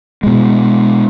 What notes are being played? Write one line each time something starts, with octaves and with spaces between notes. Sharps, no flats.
B2 G#3